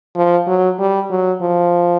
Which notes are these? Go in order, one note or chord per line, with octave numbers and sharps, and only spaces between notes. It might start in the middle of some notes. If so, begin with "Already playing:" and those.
F3
F#3
G3
F#3
F3